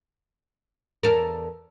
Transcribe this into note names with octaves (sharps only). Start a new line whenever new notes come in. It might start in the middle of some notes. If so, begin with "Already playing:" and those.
E2 A4 A#4